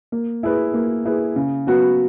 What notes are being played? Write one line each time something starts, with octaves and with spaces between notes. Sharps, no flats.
A#3
E4 G#4 B4
A#3
E4 G#4 B4
C#3
F#3 B3 F#4 B4